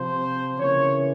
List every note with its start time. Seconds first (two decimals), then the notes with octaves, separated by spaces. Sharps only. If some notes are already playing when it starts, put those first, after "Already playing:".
Already playing: C3 F3 C4 C5
0.58 C#3 E3 A#3 C#5